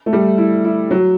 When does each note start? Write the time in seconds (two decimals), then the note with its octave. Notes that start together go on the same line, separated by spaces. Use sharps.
0.06 A3
0.13 G3
0.38 E4
0.65 E4
0.91 F#3